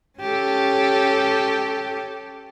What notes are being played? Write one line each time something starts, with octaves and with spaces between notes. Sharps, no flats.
C#4 G4 A4